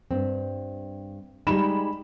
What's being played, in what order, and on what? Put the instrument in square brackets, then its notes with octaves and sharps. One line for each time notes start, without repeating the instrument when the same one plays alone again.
[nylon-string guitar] G2 C4
[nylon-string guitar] G3 G#3 D#4 [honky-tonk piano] B5 E7